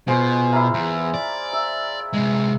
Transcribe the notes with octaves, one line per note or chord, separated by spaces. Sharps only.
B2 F4 G#4 C5
A#3 E4
E2
D5
E5
C3 G#3